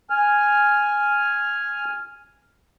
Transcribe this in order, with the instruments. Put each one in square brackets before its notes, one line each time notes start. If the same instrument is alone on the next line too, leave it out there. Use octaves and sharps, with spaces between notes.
[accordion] G#5 F6